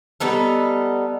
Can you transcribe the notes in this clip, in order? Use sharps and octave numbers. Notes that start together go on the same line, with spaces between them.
G3 B3 D#4 A4